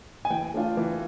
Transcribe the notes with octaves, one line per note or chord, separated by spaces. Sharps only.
G#5
E3 G5
A3 D4 F4
E3